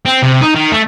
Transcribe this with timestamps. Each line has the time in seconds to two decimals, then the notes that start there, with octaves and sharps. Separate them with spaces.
0.06 C4
0.23 C3
0.41 D#4
0.55 D#3
0.72 A3